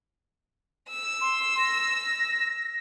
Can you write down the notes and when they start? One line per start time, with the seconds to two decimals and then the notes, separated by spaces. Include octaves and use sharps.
0.90 E6
1.21 C6
1.59 A#6